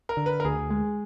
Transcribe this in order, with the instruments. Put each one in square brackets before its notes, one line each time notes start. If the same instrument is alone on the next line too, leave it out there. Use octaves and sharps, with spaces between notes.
[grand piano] A#4
[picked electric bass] D3
[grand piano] B4
A#4
[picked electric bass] D2 [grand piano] G#4
[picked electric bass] G#3